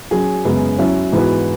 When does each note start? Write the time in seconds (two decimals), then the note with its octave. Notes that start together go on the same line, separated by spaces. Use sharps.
0.11 F#3 C#4 G#4
0.44 F#2 C#3 G#3 B3
0.78 F#3 C#4 E4
1.12 G#2 E3 B3 F#4 B4